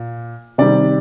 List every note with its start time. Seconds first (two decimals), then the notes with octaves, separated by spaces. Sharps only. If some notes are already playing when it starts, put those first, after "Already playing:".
Already playing: A#2
0.58 C3 D#3 G3 D5